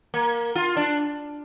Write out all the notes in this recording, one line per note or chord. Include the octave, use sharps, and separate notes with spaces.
A#3
F4
D4